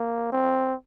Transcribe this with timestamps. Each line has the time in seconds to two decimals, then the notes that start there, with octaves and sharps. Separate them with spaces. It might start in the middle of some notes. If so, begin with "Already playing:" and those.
Already playing: A#3
0.33 C4